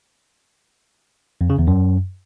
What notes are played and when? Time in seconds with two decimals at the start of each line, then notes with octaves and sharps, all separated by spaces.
1.41 F2
1.50 C#3
1.58 E2
1.67 F#2